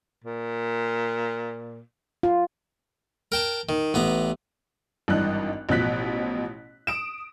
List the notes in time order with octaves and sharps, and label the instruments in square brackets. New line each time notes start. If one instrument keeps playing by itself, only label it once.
[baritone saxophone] A#2
[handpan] F4
[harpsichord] A#4 G5 A5
D#3
A1 B3 A#5
[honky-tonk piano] G#1 G2 E3 D4 D#5 F#6
A1 B2 F3 F#6 B6
D#6 D7 E7